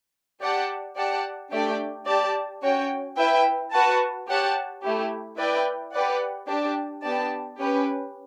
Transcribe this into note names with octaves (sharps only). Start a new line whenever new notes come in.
G4 D5 F#5 A5
G4 D5 F#5 A5
A3 D4 G4 D5 G5
G4 D5 A5
C#4 F#4 C#5 G5
E4 B4 E5 G5
F#4 B4 F#5 A5
G4 C#5 F#5 A5
A3 E4 G4
E4 B4 D5 G5
G4 B4 D5 F#5
D4 G4 D5 A5
B3 D4 G4 D5 A5
C#4 G4 B4